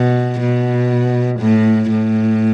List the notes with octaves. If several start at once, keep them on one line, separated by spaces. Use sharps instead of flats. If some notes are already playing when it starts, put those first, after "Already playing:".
Already playing: B2
B2
A2
A2